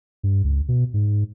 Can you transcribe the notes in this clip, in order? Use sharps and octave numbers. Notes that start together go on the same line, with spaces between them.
G2
C#2
B2
G#2